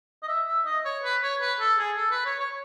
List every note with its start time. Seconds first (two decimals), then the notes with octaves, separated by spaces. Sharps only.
0.22 D#5
0.28 E5
0.46 E5
0.65 D#5
0.85 C#5
1.03 B4
1.22 C#5
1.40 B4
1.60 A4
1.78 G#4
1.97 A4
2.10 B4
2.25 C#5
2.40 C#5